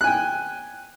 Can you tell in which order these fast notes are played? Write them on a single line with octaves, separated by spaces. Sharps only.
F#6 G#5 G5